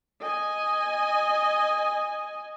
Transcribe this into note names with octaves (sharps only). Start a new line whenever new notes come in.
D#5 G#5